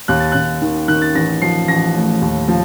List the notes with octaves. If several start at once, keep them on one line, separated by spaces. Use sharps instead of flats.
D#2 F#6
A6
D#2 F#6
D#3
D#3 F#6
A6
A1 A#6
F3 C7
A1 A#6
A2
D#2
F3